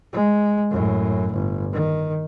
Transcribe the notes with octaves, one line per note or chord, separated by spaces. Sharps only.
G#3
F#2 A2
G1
D#3